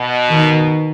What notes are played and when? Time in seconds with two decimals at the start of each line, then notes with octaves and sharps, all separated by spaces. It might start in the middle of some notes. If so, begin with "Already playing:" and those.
Already playing: B2
0.29 D#3